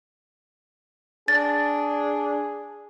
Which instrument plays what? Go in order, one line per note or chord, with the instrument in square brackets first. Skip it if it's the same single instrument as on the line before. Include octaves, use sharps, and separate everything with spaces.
[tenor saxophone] D4 [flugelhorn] G#4 [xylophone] A6